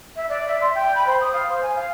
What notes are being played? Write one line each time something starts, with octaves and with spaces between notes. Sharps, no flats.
E5
D5
E5
C6
G5
B5
C5
D#6
F5
C5
G#5
F5